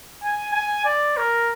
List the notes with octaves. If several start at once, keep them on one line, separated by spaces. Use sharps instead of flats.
G#5
G#5
D5
A#4